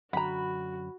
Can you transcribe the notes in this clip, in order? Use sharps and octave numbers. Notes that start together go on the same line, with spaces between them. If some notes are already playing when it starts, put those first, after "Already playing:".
F#2 D3 F#4 F#5 G5 A#5 B5